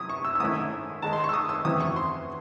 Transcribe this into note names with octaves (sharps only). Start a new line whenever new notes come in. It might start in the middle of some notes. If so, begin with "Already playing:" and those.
Already playing: C3 F#3 C#4 E4 D#6
C#6
E6
E6
G#2 D#3 A3 C#4 E4 D#6
D#3 G#3 D#4 A5
C6
C#6
E6
D#6
E6
E2 C#3 F#3 C4 E4 D#6
C#6
C6